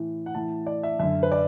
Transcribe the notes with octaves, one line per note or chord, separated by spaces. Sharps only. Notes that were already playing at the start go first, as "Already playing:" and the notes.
Already playing: A2 E3
F#5
A2 E3 A5
D5
E5
F#2 D3 E5
B4
D5